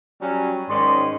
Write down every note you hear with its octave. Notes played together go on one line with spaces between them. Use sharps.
F#3 G3 C#4
G#2 D#3 C#4 D5 C6